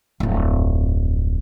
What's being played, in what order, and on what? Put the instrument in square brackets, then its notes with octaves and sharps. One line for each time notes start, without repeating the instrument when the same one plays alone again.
[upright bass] D1 F2